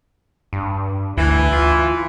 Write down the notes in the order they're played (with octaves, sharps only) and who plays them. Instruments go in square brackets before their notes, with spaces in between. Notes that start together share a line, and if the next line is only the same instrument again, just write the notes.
[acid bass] G2
[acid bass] D2 [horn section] E3
[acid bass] F4